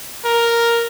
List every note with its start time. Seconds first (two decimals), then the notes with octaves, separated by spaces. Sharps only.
0.25 A#4